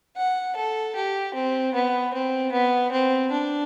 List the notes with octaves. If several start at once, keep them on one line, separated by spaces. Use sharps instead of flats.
F#5
A4
G4
C4
B3
C4
B3
C4
D4